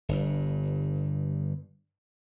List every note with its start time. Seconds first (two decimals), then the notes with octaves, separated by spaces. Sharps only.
0.09 G1 G2